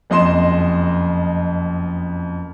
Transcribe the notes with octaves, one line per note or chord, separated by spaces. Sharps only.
F#1 F2 D#5 C6 E7